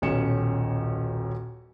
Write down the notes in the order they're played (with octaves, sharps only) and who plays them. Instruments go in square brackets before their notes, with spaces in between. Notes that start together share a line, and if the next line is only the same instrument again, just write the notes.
[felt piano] D#1 B1 C#4 C#7 E7